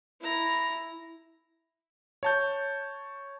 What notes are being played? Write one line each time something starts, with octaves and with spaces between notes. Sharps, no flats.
E4 A#5
C#5 A5 G6